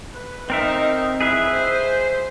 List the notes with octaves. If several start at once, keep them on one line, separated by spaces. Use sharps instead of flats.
B4
C4 D#4 A#4 E5
E4 G#4 B4 E5
C5